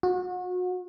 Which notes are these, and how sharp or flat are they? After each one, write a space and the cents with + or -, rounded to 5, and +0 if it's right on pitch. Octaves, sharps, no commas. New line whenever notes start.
F#4 -35